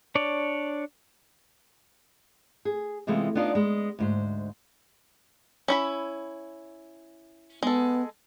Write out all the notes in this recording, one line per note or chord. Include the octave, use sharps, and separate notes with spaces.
D4 C#5 D5
G#4
C3 E3 G#3 A3 B3 F4
B3 D4 D#4 F4 D5
G#3 B3
D2 G#2 C5
C#4 E4 B5
G#3 B3 A4